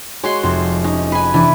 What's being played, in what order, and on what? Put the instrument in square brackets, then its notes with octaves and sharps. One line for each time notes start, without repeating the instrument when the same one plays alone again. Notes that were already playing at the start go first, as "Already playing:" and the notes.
[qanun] G#3 F#4 C6 [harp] C#5
[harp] F1 F2 [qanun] C5
[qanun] C#4 [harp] D#4
[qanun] B4 G#5
[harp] C3 E3 D4 [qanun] E4